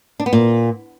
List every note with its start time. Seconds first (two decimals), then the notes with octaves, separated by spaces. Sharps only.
0.20 D4
0.26 B3
0.33 A#2